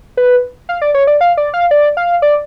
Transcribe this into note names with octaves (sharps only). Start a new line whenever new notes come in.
B4
F5
D5
C#5
D5
F5
D5
F5
D5
F5
D5